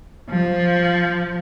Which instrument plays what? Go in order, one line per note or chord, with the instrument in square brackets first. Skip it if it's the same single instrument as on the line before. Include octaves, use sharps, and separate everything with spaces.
[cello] F3